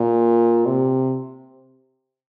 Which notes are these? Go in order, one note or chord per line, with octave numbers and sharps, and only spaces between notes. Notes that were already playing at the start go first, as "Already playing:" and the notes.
Already playing: A#2
C3